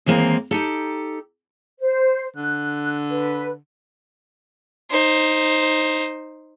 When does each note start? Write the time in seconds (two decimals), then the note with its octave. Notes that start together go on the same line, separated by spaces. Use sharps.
0.06 D#2 E3 G#3 A#3 C4 A#5
0.51 D#4 G4 A4
1.79 C5
2.36 D3 F#6
3.10 B4
4.91 D#4 C5